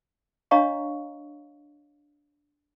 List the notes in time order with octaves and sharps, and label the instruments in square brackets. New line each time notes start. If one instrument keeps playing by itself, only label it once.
[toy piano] D4 C#5 D#5 F5 A#5 C#6